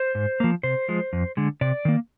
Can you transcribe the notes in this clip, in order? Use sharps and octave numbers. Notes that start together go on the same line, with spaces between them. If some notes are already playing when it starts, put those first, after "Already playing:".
Already playing: C5
G#2
F3 A#3
C3 C5
F3 G#3
F2
D3 G#3
C3 D5
D#3 A#3